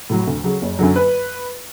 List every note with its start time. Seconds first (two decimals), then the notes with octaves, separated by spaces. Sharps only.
0.10 A2 F#3
0.27 D2
0.44 C#3 F#3
0.62 F#1
0.79 F#2 D3 F#3
0.96 B4